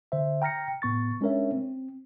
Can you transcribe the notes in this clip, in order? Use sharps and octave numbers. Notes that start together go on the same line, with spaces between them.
D3 C5 E5
G5 A#5 F6 A#6 C#7
A2 B3 C#6 A6
G#3 C#4 D4 A#4 C#5 E5
C4